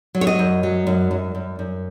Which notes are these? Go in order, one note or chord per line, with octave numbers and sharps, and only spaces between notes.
F#3
C#5
D#5
F#2
F#3
F#2
F#2
F#2
F#2